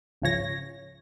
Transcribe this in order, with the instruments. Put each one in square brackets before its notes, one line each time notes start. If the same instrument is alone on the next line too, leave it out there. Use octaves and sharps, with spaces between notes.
[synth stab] G#1 C#2 C#3 F3 C#5 A#6